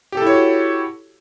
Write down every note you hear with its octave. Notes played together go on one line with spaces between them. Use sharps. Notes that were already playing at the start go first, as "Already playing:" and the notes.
E4 F#4 G4 A4 C#5